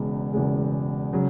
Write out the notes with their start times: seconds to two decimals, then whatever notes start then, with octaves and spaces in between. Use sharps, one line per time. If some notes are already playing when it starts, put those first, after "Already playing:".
Already playing: E1 E2 C#3 G#3
0.33 E1 E2 C#3 G#3
1.13 C#3 F#3